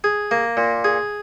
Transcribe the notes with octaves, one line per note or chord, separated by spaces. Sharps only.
G#4
A#3
A#2
G#4